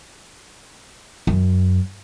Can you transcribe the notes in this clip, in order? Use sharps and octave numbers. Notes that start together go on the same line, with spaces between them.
F#2